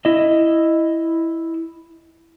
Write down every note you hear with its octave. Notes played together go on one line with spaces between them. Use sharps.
E4 D#5